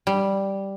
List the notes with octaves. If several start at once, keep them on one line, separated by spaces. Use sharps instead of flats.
G3